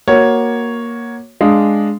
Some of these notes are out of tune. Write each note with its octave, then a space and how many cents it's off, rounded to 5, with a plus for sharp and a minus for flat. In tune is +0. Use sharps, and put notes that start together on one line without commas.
A#3 +10 F#4 +0 C#5 +0
G#3 +0 D4 +5 F5 +5